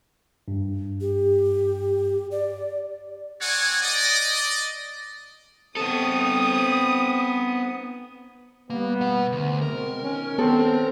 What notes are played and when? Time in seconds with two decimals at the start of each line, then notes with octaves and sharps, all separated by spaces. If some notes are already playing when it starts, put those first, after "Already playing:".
0.48 G2
1.01 G4
2.31 D5
3.41 C4 A4 C#5 D5 F#5 G#5
3.83 D5 D#5
5.77 B3 C4 A4 D#6
8.70 G3 A#3 B3
9.01 B2 F#5
9.32 D2
9.62 B2 G#3 C4 A#4
10.02 B2 D#3 C#4
10.38 D#3 B3 C4 A4